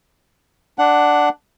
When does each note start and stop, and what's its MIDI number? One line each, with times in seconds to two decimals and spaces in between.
0.79 1.29 62
0.79 1.29 78